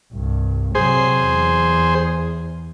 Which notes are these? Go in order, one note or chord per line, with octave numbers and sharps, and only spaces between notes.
C2 G2
C3 F#3 G#4 C5
E2